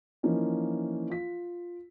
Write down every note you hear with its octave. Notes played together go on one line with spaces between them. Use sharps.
E3 F3 A#3 C#4 D#4
F4 B6